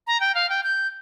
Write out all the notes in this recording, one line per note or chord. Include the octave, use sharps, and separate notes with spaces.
A#5
G5
F5
G5
G6